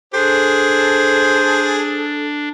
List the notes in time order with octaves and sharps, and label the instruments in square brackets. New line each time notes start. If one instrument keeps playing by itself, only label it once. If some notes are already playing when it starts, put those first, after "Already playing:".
[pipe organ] D4 [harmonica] G#4 [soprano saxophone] A4 [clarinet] C5